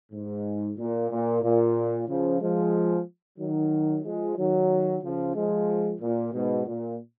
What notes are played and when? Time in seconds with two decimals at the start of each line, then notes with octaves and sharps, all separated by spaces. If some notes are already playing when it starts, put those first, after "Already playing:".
0.12 G#2
0.78 A#2
1.10 A#2
1.43 A#2
2.08 C#3 F3
2.40 F3 G#3
3.39 D#3 F#3
4.04 F3 G#3
4.37 D#3 F#3
5.02 C#3 F3
5.35 F3 G#3
6.01 A#2
6.33 G#2 B2
6.67 A#2